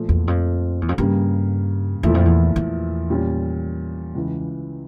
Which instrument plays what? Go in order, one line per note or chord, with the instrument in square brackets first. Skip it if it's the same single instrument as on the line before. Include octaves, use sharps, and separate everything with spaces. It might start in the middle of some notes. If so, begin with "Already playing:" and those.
Already playing: [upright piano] A#2 F3 A3
[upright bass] E2
F2
E2
F2
[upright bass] G2 [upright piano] C#3 G3 A#3
[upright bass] E2 [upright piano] A#2 F3 A3 E4
[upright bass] F2
E2
E2
[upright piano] A#2 G3 C#4
C#2 C#3 E3